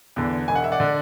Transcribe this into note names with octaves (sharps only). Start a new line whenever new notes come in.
E2 D3
E1 G#5
F#5
E5
D5 F#5
D3